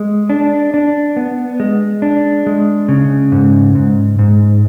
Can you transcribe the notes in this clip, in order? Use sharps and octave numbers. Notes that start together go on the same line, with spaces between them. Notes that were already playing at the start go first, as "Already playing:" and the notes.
Already playing: G#3
D4
D4
B3
G#3
D4
G#3
C#3
G#2
G#2
G#2